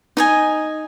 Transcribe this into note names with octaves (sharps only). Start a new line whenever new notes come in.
D#4 D#5 G#5